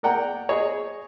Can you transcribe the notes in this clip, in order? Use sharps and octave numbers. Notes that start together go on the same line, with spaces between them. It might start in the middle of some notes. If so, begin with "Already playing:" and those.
A#4 D5 F#5 G5 A#5
G#4 C#5 D#5